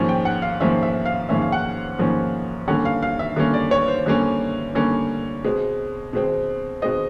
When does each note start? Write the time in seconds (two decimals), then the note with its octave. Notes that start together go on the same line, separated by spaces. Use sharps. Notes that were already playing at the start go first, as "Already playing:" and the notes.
Already playing: G#2 F3 A#3 C#4
0.09 G5
0.25 F#5
0.42 F5
0.60 G#2 F3 A#3 C#4 E5
0.83 E5
1.06 F5
1.29 G#2 F3 A#3 C#4 E5
1.42 F5
1.52 F#5
1.99 G#2 F3 A#3 C#4
2.68 D3 G3 A#3 C#4 F#5
2.85 F5
3.02 F5
3.19 E5
3.36 D3 G3 A#3 C#4
3.54 D5
3.71 C#5
3.88 C5
4.06 D3 G3 A#3 C#4
4.75 D3 G3 A#3 C#4
5.44 B2 G#3 C4
6.13 B2 G#3 C4
6.82 B2 G#3 C4 D#5